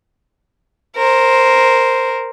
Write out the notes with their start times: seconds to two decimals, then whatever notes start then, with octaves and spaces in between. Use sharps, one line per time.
0.97 A#4 C5